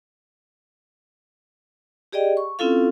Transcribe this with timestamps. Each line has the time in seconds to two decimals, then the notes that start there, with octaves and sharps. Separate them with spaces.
2.12 G4 G#4 D5 D#5 G5
2.37 C#6
2.59 C4 C#4 E4 F4 A4 F5